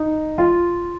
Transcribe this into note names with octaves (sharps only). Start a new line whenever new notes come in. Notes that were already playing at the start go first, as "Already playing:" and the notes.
Already playing: D#4
F4